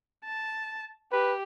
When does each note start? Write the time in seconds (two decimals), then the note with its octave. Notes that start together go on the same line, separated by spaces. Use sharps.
0.24 A5
1.12 G4 B4